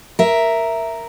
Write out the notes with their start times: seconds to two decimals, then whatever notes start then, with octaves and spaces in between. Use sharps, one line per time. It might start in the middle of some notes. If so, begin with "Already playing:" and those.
0.19 A#4 E5